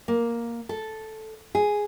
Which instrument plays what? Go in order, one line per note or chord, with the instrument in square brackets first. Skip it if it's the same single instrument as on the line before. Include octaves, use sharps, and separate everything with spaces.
[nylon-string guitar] A#3
A4
G#4